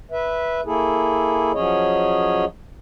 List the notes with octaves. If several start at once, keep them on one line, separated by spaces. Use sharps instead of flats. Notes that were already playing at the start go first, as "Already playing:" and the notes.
B4 E5
A#3 E4 G#4 A4
F3 F#3 C#4 G#4 C#5 D#5